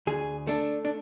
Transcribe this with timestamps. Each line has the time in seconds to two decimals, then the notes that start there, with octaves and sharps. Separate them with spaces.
0.07 D2 G#4
0.47 A3 D4
0.85 D4